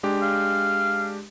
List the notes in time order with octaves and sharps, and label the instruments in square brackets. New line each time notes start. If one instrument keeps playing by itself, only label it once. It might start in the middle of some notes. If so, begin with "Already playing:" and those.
[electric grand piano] G#3 D4 G4
[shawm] F5